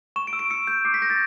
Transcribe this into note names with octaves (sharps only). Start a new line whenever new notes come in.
C#6 E7
D7
E6
D7
E6 C#7
G6
D6 C7
B6
G6 A#6
A6